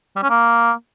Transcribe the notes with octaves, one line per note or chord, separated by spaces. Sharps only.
G3
C#4
A#3